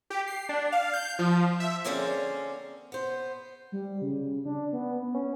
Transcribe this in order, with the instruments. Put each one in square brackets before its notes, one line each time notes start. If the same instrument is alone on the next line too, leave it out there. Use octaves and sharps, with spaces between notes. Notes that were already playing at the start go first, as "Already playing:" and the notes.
[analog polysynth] G4
C7
D4
F5
G6
F3
E5
[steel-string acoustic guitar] D3 A#3 C4 C#4 G#4 D5
B3 C5
[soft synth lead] G3
C#3
D4
B3
B3
C#4